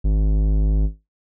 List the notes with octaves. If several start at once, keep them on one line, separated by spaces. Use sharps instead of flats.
G#1